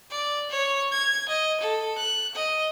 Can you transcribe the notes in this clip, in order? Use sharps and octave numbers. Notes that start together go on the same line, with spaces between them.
D5
C#5
G#6
D#5
A4
F#6
D#5